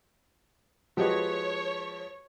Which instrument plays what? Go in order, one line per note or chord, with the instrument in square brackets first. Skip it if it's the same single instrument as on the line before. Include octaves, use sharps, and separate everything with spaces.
[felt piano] F3 G#3 B4 [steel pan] F#4 G4 D#5 [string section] C#5